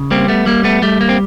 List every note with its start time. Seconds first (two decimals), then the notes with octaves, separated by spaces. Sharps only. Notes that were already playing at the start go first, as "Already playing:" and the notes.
Already playing: C#3
0.11 G3 A#3 C4
0.28 A3 B3
0.46 G3 A#3
0.64 A3 B3
0.82 G3 A3
1.01 A#3
1.09 C4